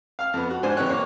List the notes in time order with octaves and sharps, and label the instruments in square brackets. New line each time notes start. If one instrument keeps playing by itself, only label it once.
[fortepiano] F5 F6
F2 B3
F#4
G#2 D4 C5 G#5
B1 C3 E3 C#5 F#6
A#3 C#5